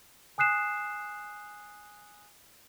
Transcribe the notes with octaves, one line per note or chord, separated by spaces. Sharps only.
G#5 D#6 F#6 C7 E7